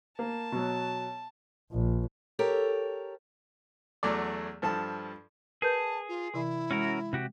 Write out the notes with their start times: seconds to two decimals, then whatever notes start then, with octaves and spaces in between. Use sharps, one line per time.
0.19 A#3 A5
0.52 B2 F#3
1.72 A#1
2.39 G4 A4 A#4 C#5
4.03 E2 F#3 A3 D5
4.62 G2 F3 A4 A5
5.62 G#4 A#4 B4 A5 G6
6.09 F4
6.34 C3 E3 E4
6.71 G#3 C#4 F#4 A#4
7.13 C3 F#4 G4